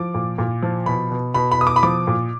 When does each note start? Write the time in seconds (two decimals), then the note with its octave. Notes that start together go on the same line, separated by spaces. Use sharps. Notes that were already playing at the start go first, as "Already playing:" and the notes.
Already playing: F3 D6
0.14 A#2
0.38 A#2
0.62 F3
0.86 B2 B5
1.11 B2
1.34 B2 B5
1.51 B5
1.58 B2 D#6
1.67 D6
1.76 B5
1.83 F3 D6
2.07 A#2